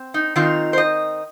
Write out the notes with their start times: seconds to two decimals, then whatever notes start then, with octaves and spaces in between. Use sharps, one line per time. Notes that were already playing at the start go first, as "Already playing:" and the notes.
Already playing: C4
0.14 D#4
0.36 D#3 C4 D#4 F4
0.73 C5
0.78 D#5